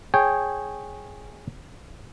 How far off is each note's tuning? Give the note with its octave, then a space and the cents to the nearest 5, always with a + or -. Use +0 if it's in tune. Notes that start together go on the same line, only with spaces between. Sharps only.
G#4 +0 C#5 -15 G5 +0